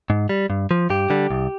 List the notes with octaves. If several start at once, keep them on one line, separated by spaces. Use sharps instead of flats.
G#2
G3
G2
F3
G2 G4
D3 G3
C2